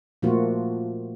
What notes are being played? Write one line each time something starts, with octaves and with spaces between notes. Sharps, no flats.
A#2 F3 A3 A#3 F4 F#4